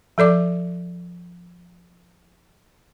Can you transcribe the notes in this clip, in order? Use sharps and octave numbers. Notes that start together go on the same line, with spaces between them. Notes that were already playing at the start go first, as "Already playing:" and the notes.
F3 A4 D5 D6